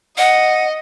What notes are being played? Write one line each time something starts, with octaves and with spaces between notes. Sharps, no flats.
D#5 F#5